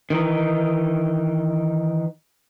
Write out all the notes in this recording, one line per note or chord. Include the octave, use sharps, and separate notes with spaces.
D#3 E3 D#4